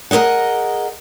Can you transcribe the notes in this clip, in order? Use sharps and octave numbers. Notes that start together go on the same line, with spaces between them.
G#4 A#4 B4 D#5 F#5